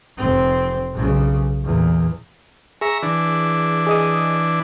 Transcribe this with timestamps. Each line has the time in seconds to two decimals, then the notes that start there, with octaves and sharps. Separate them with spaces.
0.17 F1 C4
0.93 B1 C#3
1.64 E2 A#2
2.81 G#4 E5 A#5 C#6
3.03 E3 D4
3.87 G#4 D#5 D#6